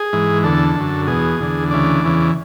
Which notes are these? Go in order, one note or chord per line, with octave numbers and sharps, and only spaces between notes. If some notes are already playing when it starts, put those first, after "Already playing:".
Already playing: G#4
G#2 E3
E2 D3 A4
F#2 D3
E2 B2 G#4
E2 D3
D2 C#3 E3 D5
E2 C#3 E3